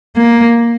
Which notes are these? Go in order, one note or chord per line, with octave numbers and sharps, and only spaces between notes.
A#3